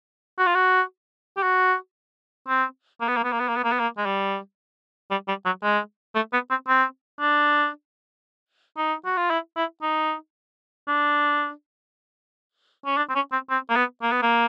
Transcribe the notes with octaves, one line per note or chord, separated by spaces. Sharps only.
F#4
F4
F#4
G4
F#4
C4
A#3
B3
A#3
B3
A#3
B3
A#3
B3
A#3
B3
A#3
G#3
G3
G3
G3
F#3
G#3
A3
B3
C4
C4
D4
D#4
F#4
F4
E4
E4
D#4
D4
C#4
D4
C4
C#4
C4
C4
A#3
B3
A#3
B3
A#3